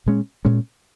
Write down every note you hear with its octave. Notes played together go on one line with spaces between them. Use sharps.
A#2 G#3 C#4
A#2 G#3 C#4